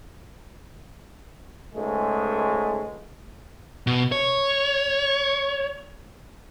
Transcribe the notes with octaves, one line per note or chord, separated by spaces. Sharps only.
C#2 G#2 G#3 A3
B2
C#5